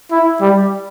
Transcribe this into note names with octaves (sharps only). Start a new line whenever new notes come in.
E4
G3